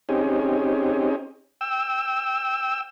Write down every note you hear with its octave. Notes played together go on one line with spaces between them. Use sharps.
C4 C#4 D#4 G4 G#4
G5 E6